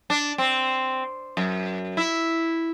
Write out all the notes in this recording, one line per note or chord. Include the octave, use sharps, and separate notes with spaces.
D4
C4
F#2
E4